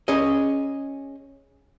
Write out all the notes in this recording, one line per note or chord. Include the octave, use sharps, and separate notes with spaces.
C#4 G#4 D#5